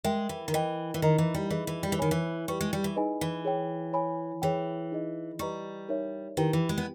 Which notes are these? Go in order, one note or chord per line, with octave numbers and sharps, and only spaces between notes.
G#3 A#4 E5 G5
E3
D#3
E3 A#4 D#5 G5
E3
D#3 D#4 A#4 D#5 A#5
E3
G3
E3 D#4 G#4 D#5
E3
G3
E3
D#3 C#5 G#5 B5
E3
G3 B4 G5 C#6
G#3
G3
E3
D#4 G#4 B4 D#5 G#5
E3
G#4 C#5 G5
C#5 G#5 B5
E3 G#4 C#5 G5
D#4 G#4 D#5
G3 B4 D#5 A#5 C#6
D#4 A#4 C#5 E5
D#3 E4 G4 B4 G5
E3
G#3
B3